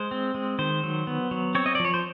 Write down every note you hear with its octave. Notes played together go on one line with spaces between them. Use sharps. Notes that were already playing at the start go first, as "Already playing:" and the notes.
Already playing: G#3 C5
C4
G#3
D#3 C5
F#3
B3
F#3
C4 C#5
D#5
D5
F3
C#5
C5